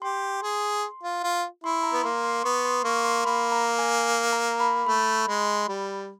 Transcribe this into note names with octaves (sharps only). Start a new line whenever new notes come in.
G4 C6
G#4
F4
F4
E4 C6
A#5
B3
A#3 C6
C6
B3 C#6
C6
A#3 C#6
C6
A#3 B5
A#5
G#5
A#5
B5
A3 B5
G#3
G3